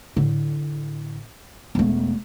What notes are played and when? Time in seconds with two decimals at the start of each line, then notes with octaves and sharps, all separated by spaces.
0.16 A2 D3
1.75 E1 A3